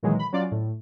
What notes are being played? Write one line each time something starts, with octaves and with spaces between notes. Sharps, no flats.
A#2 D#3 E3 F#3 G#3
B5
F#3 C#4 F4 D5
A2